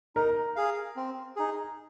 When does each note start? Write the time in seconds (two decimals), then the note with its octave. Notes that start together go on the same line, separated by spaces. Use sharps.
0.16 D#4 A#4
0.56 G#4 F5
0.96 C4
1.36 D#4 G#4